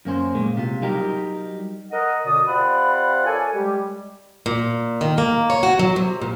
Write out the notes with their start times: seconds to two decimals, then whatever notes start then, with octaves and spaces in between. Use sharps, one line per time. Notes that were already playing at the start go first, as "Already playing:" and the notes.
0.05 F#2 A#3 C#4 C5
0.35 A#2 G#3 A#3
0.57 C3 F4
0.82 F#3 G3 D#4 G4 A#4
1.91 A#4 D#5 F#5
2.24 F#2 B2 D3 D5 D#6
2.47 C3 F4 D5 F5 F#5 B5
3.25 A4 A#4 C#5 D5 G#5
3.53 G3 G#3 G4
4.46 A#2
5.01 D#3
5.18 A#3
5.50 C#5
5.63 F#4
5.79 F#3
5.96 C3
6.22 A#2